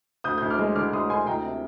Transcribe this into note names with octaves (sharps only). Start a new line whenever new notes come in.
D2 D#6 G6
D2 G6
D6 F6
G#3
D3 D6 F6
D2 C6 D#6
D2 G#5 C6
D2 G5 A#5
C3